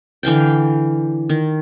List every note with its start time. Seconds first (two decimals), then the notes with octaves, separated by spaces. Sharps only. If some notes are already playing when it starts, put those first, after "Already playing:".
0.23 D3 E3 F5 G5
1.29 D#3